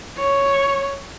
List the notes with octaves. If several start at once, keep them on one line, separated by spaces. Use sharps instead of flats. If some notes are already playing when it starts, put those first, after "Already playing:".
C#5